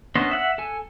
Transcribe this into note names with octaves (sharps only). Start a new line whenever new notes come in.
B3 C#4 D4 C5 D#5
E5 F#5 F#6
A4 G#5